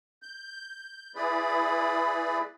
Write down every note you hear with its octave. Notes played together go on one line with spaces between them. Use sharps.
G6
E4 G#4 B4 D5 B5